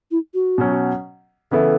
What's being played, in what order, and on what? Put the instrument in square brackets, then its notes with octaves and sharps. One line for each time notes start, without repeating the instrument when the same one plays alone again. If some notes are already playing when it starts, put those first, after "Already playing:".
[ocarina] E4
F#4
[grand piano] B2 F#3 C#4
[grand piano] C#3 E3 B3 E4 [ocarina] A4